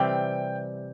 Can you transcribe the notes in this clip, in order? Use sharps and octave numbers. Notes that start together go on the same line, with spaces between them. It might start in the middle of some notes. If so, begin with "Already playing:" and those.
Already playing: C3 E3 G3 C4 G4 G5